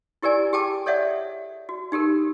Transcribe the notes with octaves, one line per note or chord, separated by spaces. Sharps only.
E4 G4 A#4 D5 G#5
G4 G#4 G5 A5 D6
A4 C#5 D5 E5 F#5
F#4
D#4 G4 A4 A#4